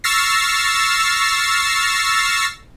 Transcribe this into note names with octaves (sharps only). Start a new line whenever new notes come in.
C#6 E6 F6 A6 A#6 C7